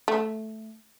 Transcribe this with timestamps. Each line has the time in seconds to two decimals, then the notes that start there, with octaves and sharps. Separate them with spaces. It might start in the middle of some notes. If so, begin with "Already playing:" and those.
0.08 A3